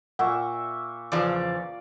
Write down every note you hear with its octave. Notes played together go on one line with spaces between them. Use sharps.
A#2 E5 F#5 C#6
E2 C#3 F3 D5 F5